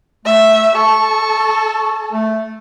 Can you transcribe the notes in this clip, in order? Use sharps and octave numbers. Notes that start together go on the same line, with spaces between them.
A3 E5
A4 C#6
A3